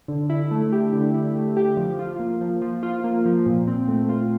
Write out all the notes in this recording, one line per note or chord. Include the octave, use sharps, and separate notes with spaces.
D3
E4
A3
G4
D3
E4
A3
G4
F3
F4
A#3
F3
F3
F4
A#3
F3
A#2
C4
A3
F4